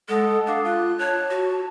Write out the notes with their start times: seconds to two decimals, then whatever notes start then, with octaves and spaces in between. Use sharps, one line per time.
0.09 G#3 A4 F#5 D#6
0.47 D4 F5 D6 D#6
0.64 F4 F#6
0.99 C#5 A5
1.30 F#4